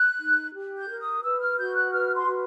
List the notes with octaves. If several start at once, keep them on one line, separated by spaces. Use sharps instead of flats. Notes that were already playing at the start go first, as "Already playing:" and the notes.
Already playing: F#6
D#4
G4
G6
A#4
D#6
B4 E6
F6
F#4 G6
F#6
B4 F6
C6
F#4